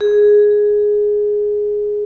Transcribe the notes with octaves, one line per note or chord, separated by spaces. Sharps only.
G#4